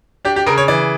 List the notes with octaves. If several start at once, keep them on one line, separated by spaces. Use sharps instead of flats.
D4 G4
G4
C#3 A#4
C#5
E3 D5